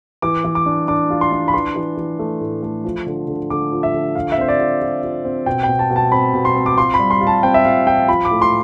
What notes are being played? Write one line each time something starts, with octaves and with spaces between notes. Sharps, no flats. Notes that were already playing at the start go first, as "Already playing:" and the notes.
E3 D6
E3
D6
D4
D4 D6
F4
C6
D4
B5
E3 C6
E3
E3
A3
A2
A3
F3
D3
D3
D3 D6
F3
E5
D3
F4 F5
E5
C4 C5
D5
F4
F4
F4
C4
B2 G5
G5
B2
A5
B2
A5
C4 B5
B2
C6
C4
D6
F4 C6
B5
G3
C6
F4
A5
C4 G5
E5
F4 F5
F4 G5
F3 B5
D6
A2
C6